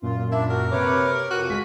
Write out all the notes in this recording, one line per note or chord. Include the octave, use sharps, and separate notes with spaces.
F#2 A#2 F4
D4 E4
F#4 A#4
C3 B4 C#5 D6
F2 F#4 D#7
G1 G#3 B6